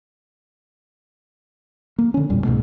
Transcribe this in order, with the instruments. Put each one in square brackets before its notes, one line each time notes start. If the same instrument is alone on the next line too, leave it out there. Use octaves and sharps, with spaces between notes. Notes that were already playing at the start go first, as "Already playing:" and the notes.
[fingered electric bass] A#3
D3 C#4
A1 E2 A#2 G3
C2 G#2 B2 A3